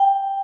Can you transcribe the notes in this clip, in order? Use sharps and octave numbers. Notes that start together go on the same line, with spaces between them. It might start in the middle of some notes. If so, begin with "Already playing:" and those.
Already playing: G5